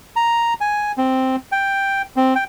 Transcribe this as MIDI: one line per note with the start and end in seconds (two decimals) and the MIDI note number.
0.16 0.54 82
0.61 0.92 80
0.98 1.36 60
1.52 2.02 79
2.16 2.34 60
2.35 2.44 79